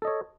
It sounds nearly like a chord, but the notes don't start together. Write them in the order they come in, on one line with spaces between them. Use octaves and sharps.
A4 D#5 C#5